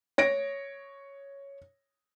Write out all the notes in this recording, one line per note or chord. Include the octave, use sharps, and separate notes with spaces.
C#5 A#6 D7